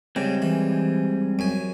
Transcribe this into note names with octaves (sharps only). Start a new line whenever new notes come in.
C#3 G3 G#3 C4
E3
F#2 G#5